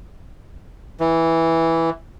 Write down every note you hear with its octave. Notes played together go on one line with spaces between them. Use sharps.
E3